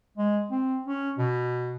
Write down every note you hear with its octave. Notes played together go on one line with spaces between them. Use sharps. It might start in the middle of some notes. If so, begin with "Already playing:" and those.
G#3
C4
C#4
B2